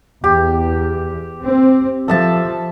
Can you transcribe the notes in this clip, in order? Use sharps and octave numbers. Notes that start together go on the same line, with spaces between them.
E2 G4
C4
F3 A4 E5 A5